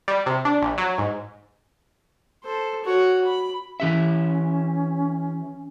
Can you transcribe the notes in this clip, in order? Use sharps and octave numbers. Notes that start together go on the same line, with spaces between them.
G3
C3
D4
A#1
F#3
G#2
A4 C5
F#4 C#5
B5
E3 C#4 G4 E5